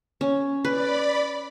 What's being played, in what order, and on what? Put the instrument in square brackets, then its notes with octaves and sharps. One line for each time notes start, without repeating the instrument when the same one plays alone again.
[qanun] C#4
[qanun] B4 [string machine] D5 B5